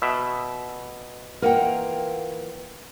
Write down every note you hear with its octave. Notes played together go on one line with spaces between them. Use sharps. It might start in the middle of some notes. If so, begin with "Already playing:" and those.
B2 E5
E3 A#3 F4 A#4 F#5 G5